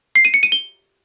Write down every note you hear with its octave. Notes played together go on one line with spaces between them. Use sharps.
C7
D#7
C#7
D#7
G7